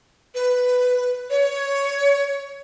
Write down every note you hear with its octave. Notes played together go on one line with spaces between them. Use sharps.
B4
C#5